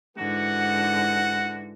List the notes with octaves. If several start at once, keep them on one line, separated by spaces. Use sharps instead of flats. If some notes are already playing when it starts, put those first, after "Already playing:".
G#2 D3 E3 F#4 F#5